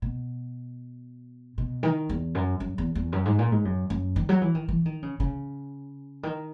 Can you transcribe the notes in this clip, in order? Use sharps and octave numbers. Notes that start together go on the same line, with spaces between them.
B2
B2
D#3
E2
F#2
F#2
E2
E2
F#2
G#2
A#2
G#2
F#2
F#2
D#3
F#3
E3
D#3
E3
D#3
C#3
C#3
D#3